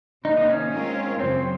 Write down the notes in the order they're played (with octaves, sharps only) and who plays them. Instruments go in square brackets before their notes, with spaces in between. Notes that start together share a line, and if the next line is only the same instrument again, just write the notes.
[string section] C3 D#3 A#3 [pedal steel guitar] D#4
[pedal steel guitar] D#4
C#4
[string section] G#3 C4 F4 A#4 C#5
[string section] F#2 C#3 F#3 [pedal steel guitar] C4